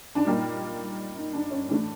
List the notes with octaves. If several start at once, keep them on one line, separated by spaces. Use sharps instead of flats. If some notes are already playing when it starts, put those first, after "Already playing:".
D4
A#2 G3 A#3 D#4
D#4
D4
C#4
A2 E3 A3 D4